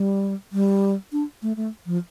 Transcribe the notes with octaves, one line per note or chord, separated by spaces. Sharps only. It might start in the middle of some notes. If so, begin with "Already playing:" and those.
Already playing: G3
G3
D4
A3
A3
F3